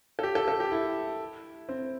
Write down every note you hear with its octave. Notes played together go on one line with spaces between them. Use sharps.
A4
G4
A4
A4
G4
E4
C4